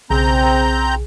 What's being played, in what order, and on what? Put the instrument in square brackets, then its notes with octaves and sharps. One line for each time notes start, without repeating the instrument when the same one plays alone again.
[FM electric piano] B1 C#3 G#4 [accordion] C4 A#5 G6